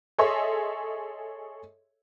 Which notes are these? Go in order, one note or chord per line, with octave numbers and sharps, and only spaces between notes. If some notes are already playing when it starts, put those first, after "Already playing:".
G#4 A4 C#5 D#5 E5 C6